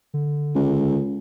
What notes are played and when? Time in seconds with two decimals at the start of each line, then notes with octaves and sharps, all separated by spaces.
0.14 D3
0.55 C#2